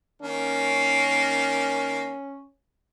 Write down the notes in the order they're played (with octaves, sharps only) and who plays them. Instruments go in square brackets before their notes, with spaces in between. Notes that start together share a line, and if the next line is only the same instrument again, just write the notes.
[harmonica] D#3 A#3 [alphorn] C#4